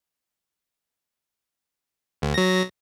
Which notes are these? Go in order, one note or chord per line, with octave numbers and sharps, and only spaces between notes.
D2
F#3 A#6